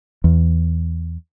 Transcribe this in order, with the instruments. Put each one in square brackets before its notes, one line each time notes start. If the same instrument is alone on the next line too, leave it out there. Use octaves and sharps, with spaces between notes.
[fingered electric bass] E2